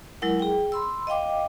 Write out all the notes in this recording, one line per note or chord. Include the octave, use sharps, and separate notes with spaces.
F#3 G#3 E4 A#4 F#5
G#4 G5
B5 C6 E6
D#5 F5 G5 D6